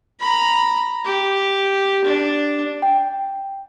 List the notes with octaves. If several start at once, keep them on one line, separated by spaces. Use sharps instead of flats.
A#5 B5
G4
D4
G5